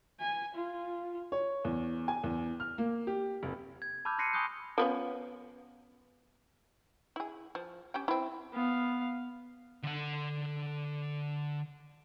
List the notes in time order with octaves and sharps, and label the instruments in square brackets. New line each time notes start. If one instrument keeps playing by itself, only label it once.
[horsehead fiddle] G#5
F4
[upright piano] C#5
E2
G#5
E2
F6
A#3
G4
F1
[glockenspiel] G#6
A5 B5 D6 E6 F6 G6
C6 F#6 A#6 C7 C#7 D#7
G#5 B5 C#6 D#6 F#6 G6
[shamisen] F3 B3 C#4
E4 G#4
F3
C#4 G4 G5
C4 E4
[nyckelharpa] B3 F5
[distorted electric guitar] D3 F#5